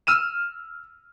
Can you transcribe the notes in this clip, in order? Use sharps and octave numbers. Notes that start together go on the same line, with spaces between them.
E6 F6 D#7 E7